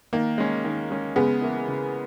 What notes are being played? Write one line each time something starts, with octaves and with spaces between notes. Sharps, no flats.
D#3 A#3
G#3 C#4
D#3
G#3 C#4
C#3 G#3 B3
E3 A#3 E4
C#3